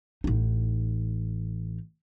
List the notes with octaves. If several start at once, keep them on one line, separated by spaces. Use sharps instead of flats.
A1 D#4